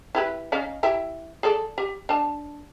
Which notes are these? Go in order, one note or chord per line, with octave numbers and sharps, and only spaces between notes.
E4 G4 B4
C#4 D#4 F5
E4 G4 E5
G#4 A4 D5
G4
D4 A5